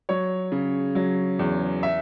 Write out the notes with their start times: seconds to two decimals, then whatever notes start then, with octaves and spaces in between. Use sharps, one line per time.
0.09 F#3 C#5
0.52 C#3
0.95 F#3
1.39 E2
1.83 E5